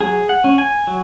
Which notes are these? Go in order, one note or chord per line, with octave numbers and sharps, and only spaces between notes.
F#3 G#4
F#5
C#4
G#5
F#3